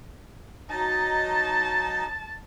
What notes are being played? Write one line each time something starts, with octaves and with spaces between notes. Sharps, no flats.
F#3 D#4 D#5 A5